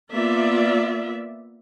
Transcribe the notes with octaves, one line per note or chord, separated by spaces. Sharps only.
A#3 B3 F4 D5 E5